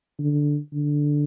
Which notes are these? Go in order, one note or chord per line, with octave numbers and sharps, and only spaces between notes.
D3
D3